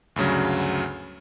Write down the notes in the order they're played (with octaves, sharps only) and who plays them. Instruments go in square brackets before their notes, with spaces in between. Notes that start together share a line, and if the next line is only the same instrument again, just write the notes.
[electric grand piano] D2 G2 C#3 F#3